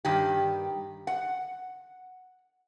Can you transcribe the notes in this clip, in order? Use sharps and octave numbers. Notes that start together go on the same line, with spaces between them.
G2 D#3 G4
F#5